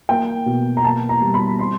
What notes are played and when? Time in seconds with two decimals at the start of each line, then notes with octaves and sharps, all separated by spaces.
0.09 A#3 G5
0.46 B2
0.77 A#5
0.84 A#3 A5
1.09 A#5
1.21 G3
1.34 B5
1.59 C4 C6